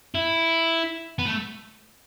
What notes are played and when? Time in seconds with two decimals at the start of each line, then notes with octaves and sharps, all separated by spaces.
0.15 E4
1.19 B3
1.26 A3